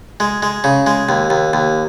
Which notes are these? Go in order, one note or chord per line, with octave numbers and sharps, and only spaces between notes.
G#3
G#3
C#3
G#3
D#2
D#2
D#2